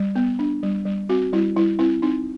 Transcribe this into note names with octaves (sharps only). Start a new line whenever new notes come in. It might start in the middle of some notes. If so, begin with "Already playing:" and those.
Already playing: G3
B3
D4
G3
G3
C4 F#4
G3 E4
G3 E4
C4 E4
C4 D#4